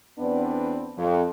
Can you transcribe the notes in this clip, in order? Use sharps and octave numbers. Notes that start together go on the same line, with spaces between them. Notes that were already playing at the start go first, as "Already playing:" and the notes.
E2 B3 C4 D4 B4 D5
F2